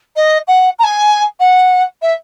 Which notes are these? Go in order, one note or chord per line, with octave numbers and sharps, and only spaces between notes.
D#5
F#5
A#5
G#5
F#5
E5